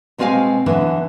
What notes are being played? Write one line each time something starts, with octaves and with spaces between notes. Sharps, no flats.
B2 G#3 C4 A4 F5 G#5
D3 E3 F#3 B3 E4